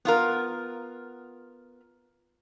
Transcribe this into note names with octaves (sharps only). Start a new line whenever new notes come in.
B3 F4 A#4